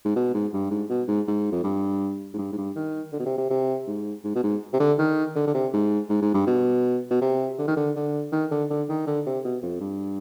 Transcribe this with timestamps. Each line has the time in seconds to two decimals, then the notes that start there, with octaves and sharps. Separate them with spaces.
0.05 G#2
0.16 B2
0.34 G#2
0.53 G2
0.71 G#2
0.89 B2
1.08 G#2
1.28 G#2
1.52 F2
1.64 G2
2.34 G#2
2.38 G2
2.52 G#2
2.58 G2
2.76 D#3
3.12 D3
3.20 B2
3.26 C3
3.38 C3
3.50 C3
3.87 G#2
4.24 G#2
4.35 B2
4.43 G#2
4.73 C3
4.80 D3
4.98 D#3
5.36 D3
5.47 D3
5.54 C3
5.73 G#2
6.09 G#2
6.22 G#2
6.34 G2
6.47 B2
7.11 B2
7.21 C3
7.59 D3
7.68 D#3
7.77 D3
7.96 D3
8.32 D#3
8.51 D3
8.70 D3
8.89 D#3
9.07 D3
9.26 C3
9.45 B2
9.63 F2
9.81 G2